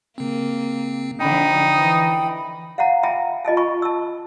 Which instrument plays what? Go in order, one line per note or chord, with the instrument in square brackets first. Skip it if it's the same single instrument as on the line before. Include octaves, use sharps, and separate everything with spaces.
[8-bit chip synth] C#3 C4 [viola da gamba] A#3
[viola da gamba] D3 F3 [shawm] D#4 [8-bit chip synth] G5 B5
[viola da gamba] E3
[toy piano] F5 F#5 A#5
E5 G5 G#5 A#5 B5
F4 D#5 G#5 A5
G#5 B5 C#6
A5 E6